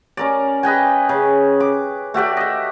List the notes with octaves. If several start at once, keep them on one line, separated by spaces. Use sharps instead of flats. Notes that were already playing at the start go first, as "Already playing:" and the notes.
C#4 A#4 D5
B4 D#5 G5 G#5
C#3
D6
A3 F#4 G4 D5
D#5 E5